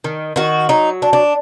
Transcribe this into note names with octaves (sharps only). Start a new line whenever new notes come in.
D#3
D#3 F#4
F#3 D#4
D4
D4